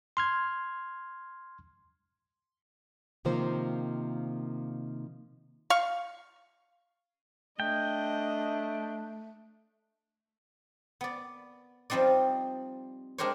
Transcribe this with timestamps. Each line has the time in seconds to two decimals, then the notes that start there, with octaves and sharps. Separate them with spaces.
0.17 C6 F6 G#6
3.25 C3 D#3 F3 A#3 C5
5.70 F5 C#6
7.60 A3 D4 D#5 G5
11.01 B3 D5
11.90 F3 G3 C4 D#4 D5
13.18 G#3 D4 G4 A#4 C5 C#5